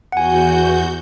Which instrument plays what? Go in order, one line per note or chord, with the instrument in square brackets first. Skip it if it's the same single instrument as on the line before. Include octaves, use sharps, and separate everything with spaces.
[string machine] E2 F#4 G6 [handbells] F#5 G#5